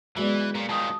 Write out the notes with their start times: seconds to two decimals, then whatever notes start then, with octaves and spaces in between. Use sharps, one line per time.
0.17 E3 F#3 G#3 B3 D5
0.55 A#2 A#4 C#5 D5
0.69 A#2 D#3 A5 D#6